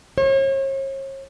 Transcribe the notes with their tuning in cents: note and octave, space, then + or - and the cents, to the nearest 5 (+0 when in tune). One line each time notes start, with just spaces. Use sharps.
C#5 -40